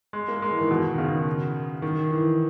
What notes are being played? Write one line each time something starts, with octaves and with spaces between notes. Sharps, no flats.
G#3
A#3
G#3
E3
D#3
B2
D#3
C#3
D#3
E3